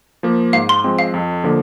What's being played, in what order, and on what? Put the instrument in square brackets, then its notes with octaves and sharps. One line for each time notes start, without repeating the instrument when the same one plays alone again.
[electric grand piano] F3 A#3
[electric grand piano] G#2 [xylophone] F5
[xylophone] C6
[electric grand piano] F3 G#3 C4
[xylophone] F5
[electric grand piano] F2
D3 F3 A#3